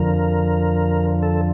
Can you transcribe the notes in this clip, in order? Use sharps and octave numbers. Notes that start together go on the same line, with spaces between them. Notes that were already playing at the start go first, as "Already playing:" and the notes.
Already playing: F2 D3 F3 A#4
A4